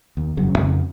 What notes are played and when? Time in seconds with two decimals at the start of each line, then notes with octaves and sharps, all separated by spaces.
0.17 D#2
0.37 E1 C2 F#2 C#3
0.59 F2 C#3 C4